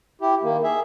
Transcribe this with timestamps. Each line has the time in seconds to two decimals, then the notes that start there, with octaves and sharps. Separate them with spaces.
0.22 E4 G4
0.43 D#3 A#3
0.64 G#4 E5